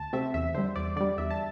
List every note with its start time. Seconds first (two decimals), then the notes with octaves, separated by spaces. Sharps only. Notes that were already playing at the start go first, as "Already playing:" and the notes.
Already playing: D2 A5
0.13 C3 A3 C4 E5
0.34 E2 E5
0.55 D3 G3 C5
0.76 E2 D5
0.96 D3 G3 D5
1.18 E2 E5
1.31 A5